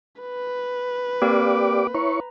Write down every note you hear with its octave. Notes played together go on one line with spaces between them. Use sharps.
B4
A#3 C4 G4 A#4 D5 D6
E4 C#5 A#5 C#6